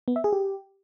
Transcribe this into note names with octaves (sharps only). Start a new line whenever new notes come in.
B3
E5
G#4
G4